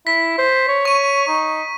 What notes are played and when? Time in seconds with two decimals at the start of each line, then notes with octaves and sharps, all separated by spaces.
0.07 E4 B6
0.38 C5
0.68 C#5
0.85 C#6 D#7
1.28 D#4